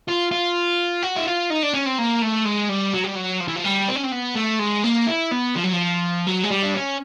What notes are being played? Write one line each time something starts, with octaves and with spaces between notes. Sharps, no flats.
F4
F4
F#4
E4
F4
D#4
D4
C#4
C4
A#3
A3
G#3
G3
F#3
G3
F#3
F3
E3
F3
G3
C4
C#4
C4
B3
A3
G#3
A#3
E4
B3
F3
F#3
F3
F#3
G#3
G3
D4
C#4